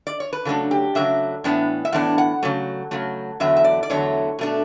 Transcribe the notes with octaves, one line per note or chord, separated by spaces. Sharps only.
D5
C#5
B4
C#3 F#3 A3 D4 A4
G4
C#3 F#3 A3 D4 E5
A2 E3 B3 D4
E5
A2 E3 B3 D4 F#5
F#5
C#3 F#3 A3
C#3 F#3 A3
E2 D3 F#3 A3 E5
E5
D5
D5
E2 D3 F#3 A3 C#5
B2 A3 D4